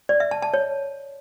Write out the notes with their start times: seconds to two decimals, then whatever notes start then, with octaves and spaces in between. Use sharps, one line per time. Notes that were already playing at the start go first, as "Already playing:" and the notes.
0.09 D5
0.20 E5
0.31 A5
0.42 A5
0.54 C#5